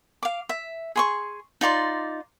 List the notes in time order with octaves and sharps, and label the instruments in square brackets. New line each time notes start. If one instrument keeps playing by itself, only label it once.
[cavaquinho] F5 D6
E5
G#4 C6 C#6
D#4 F4 D5 C6